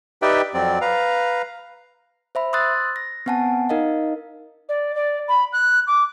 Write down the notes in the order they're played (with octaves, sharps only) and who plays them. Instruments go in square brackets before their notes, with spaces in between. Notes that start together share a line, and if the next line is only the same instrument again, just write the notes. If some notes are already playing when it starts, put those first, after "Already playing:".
[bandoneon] D#4 G4 B4 D5 E5 G5
F2 F#3 C4 D5
B4 F5 A#5
[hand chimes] C5 E5 B5
C6 D#6 E6 F#6 A6
A#6
B3 C4 F#5 G#5 A5
D#4 A#4 D#5 F5
[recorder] D5
D5
B5
F#6
D6